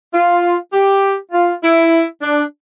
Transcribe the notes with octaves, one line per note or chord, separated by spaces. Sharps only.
F4
G4
F4
E4
D4